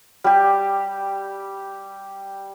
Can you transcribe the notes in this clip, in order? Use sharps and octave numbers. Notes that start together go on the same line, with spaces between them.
G3 G4